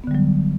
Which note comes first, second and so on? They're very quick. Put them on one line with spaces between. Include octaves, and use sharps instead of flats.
B3 D3 G3 F#3